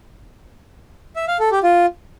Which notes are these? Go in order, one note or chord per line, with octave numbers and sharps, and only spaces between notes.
E5
F5
A4
G4
F4